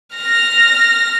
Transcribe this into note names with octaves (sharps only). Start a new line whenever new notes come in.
F6 A#6